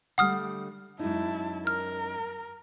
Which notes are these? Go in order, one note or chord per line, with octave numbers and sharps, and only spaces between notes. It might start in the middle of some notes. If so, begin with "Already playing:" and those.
D3 G3 A3 F#5 D#6 F6
F#2 G#3 D#4 E4 A5
A#4 F6